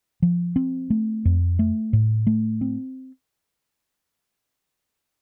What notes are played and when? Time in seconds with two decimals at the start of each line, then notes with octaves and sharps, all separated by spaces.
0.22 F3
0.56 C4
0.90 A3
1.25 F2
1.59 A3
1.93 A2
2.27 A3
2.61 C4